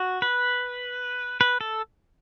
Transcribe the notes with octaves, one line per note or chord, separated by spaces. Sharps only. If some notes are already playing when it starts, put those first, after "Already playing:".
Already playing: F#4
B4
B4
A4